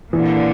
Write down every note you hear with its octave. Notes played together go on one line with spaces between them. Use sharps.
A#2 D3 E3